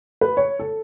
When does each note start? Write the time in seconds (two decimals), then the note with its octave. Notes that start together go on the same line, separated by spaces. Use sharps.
0.21 B4
0.37 C#5
0.59 A4